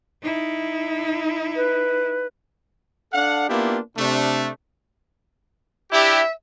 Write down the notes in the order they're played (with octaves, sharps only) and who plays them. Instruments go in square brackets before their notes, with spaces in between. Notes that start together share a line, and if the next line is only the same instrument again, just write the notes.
[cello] D#4 E4
[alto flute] B4
[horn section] D4 A4 F5 F#5
A#3 B3 D4 E4 F4 G4
C3 A3 D4
[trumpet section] D4 E4 G4 [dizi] E5